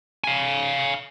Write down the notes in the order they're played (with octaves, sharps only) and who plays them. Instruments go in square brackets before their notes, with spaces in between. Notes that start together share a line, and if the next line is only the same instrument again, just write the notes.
[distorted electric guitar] F5 G#5